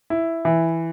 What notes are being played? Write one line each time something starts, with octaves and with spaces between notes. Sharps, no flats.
E4
E3